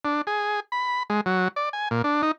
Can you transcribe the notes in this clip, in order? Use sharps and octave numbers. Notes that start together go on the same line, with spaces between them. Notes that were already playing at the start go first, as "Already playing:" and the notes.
D4
G#4
B5
G#3
F#3
D5
G#5
A#2
D4
D#4